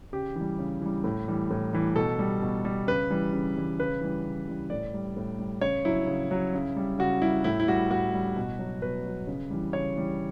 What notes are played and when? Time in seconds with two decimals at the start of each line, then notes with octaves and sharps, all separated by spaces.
0.13 C#3 G4
0.36 E3
0.41 G3
0.59 C#3
0.82 E3 G3
1.04 A2
1.28 E3 G3
1.51 A2
1.73 E3 G3
1.95 B2 A4
2.19 G3
2.42 B2
2.65 G3
2.87 C#3 B4
3.10 E3 G3
3.33 C#3
3.56 E3 G3
3.79 C#3 B4
4.01 E3 G3
4.25 C#3
4.48 E3 G3
4.70 A2 D5
4.94 G3
5.17 A2
5.39 G3
5.61 C#3 C#5
5.85 F#3 E4
6.07 C#3
6.31 F#3
6.54 C#3
6.76 G3
6.99 C#3 F#4
7.22 G3 E4
7.44 A2 E4
7.60 E4
7.68 G3 F#4
7.91 A2 F#4
8.14 G3
8.36 B2
8.59 F#3
8.82 B2 B4
9.06 F#3
9.27 C#3
9.50 E3 G3
9.73 C#3 C#5
9.96 E3 G3